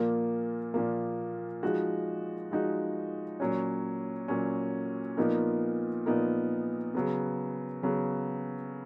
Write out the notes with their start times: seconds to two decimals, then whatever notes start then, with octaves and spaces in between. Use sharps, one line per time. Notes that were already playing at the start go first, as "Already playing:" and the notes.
Already playing: A#2 F3 A#3
0.74 A#2 F3 A#3
1.63 F3 G#3 D#4 F#4
2.51 F3 G#3 D#4 F#4
3.40 A#2 F#3 C#4
4.28 A#2 F#3 C#4
5.17 A#2 F3 B3 D#4 A#4
6.06 A#2 F3 B3 D#4 A#4
6.94 C#3 F#3 B3
7.83 C#3 F#3 B3